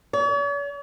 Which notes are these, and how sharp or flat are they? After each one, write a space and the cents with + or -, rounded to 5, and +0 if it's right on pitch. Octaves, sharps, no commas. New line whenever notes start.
C#5 +45